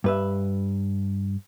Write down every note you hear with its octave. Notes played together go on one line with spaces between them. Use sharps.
G2 B4 E5